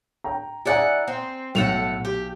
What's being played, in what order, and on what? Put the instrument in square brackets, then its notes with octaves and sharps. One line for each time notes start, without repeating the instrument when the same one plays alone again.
[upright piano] G5 A#5
[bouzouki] E4 D5 F#5 [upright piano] G#4 G#5 A#5
[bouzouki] C4
[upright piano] B1 F7 [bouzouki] A2 A4 F#5
[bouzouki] G4